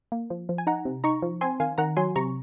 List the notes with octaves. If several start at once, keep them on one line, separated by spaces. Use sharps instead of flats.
A#3
F3
F3
G#5
D#4 F#5 A#5
C3
D#4 A#5 C#6
F3
C4 G#5 C6
D#3 F5 G#5
D#3 F#5 A#5
F#3 G#5 C6
C3 A#5 C#6